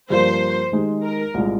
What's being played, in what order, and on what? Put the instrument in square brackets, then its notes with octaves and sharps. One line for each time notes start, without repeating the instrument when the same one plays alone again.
[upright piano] G2 F3 A#3 [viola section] C5
[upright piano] D#3 G#3 D#4 G4
[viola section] A#4
[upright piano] C2 A#2 G#3